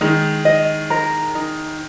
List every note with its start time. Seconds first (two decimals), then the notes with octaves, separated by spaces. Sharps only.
0.01 D#3 G#3 D#4
0.45 D#5
0.90 A#4
1.35 D#4